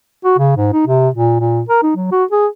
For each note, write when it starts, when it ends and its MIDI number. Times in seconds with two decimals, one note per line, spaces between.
0.24 0.34 66
0.38 0.52 49
0.57 0.69 44
0.73 0.84 63
0.87 1.09 48
1.15 1.37 46
1.40 1.62 46
1.69 1.80 70
1.83 1.92 63
1.96 2.08 54
2.12 2.24 66
2.31 2.47 68